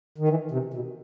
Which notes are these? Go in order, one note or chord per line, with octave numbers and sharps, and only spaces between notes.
D#3
E3
C3
B2